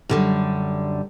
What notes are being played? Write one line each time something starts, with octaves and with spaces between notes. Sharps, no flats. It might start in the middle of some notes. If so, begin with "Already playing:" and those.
F#2 D3 G3